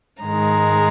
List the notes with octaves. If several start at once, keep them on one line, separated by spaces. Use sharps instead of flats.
G#2 D#3 G#3 A#5